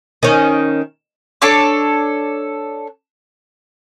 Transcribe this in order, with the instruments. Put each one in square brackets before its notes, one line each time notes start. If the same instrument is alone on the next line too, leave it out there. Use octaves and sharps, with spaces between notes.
[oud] D#3 C#4
[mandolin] D4 A4 C#5 D6